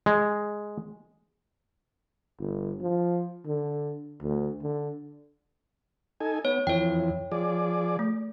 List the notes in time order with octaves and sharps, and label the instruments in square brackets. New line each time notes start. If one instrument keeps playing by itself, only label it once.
[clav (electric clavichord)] G#3
[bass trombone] G1
F3
D3
D2
D3
[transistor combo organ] D#4 A4 G#5
[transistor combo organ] B3 [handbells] C#5
[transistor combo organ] F2 E3 [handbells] C#5 G5
[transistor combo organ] F3 G#4 D5
[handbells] A3